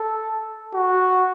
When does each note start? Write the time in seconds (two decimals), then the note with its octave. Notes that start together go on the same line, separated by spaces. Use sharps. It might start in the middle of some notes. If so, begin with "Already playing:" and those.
Already playing: A4
0.74 F#4